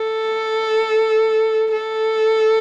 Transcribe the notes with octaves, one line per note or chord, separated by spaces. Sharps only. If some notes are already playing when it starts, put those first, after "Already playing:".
Already playing: A4
A4